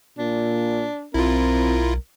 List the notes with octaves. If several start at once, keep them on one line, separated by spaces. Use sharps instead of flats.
A#2 D4
B1 C4 E4 F4 A#4